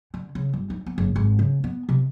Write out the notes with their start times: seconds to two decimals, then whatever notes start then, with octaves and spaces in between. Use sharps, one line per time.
0.14 D3
0.35 C#3
0.54 G1
0.70 D#4
0.86 B3
0.98 F#1
1.16 G#1
1.39 C#3
1.64 B3
1.89 C3